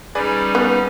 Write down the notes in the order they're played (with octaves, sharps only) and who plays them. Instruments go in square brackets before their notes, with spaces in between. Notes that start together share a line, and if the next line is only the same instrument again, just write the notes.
[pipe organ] G3 C#4 D#4 [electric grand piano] G#4 B4 D5
[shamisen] B3